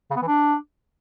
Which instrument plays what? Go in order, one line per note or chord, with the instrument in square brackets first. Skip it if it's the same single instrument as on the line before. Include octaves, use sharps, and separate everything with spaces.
[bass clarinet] C#3
B3
E3
D4